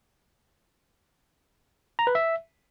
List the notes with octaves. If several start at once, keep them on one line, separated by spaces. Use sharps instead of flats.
A#5
B4
E5